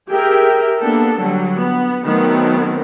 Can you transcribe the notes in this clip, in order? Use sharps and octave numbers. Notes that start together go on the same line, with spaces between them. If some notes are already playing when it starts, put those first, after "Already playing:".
G4 G#4 A#4 E5 G5
A#3 B3 D4 A4
D3 F#3 G3
B3
D#3 F#3 A3 B3 C4